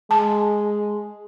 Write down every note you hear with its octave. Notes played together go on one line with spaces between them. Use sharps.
G#3 A5